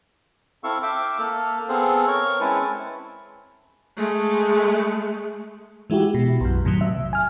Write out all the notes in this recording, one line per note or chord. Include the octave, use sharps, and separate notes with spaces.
C4 E4 A4 F5 C#6 E6
E5 F5 G5 D6
A#3 A4 F6
B3 C4 G#4 A4 C5 F5
A#4 C#5 C#6
G#3 C4 C#4 E4 B4 A5
G#3 A3
E3 G#3 E4 F#4 G4
B2
B1 F#2
A2 C3 D#3 F#3
E5
G#5 F6